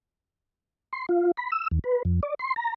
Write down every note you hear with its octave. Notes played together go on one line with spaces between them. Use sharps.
C6
F4
B5
E6
D#2
B4
F2
D5
C6
A#5